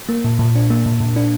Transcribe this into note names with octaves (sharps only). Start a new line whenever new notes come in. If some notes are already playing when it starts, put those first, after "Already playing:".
A#3
A#2
A#2
D4
A#3
A#2
A#2
D4